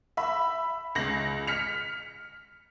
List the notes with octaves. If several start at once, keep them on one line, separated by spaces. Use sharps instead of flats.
E5 B5
C#2 A#6 F#7
F6 B6 C#7 F7